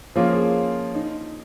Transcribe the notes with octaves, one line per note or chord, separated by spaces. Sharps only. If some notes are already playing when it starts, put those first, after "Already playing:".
F3 A#3 C#4 F4 G#4
D#4